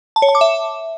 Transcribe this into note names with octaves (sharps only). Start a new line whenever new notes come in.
A5
C#5
A5
D6
E5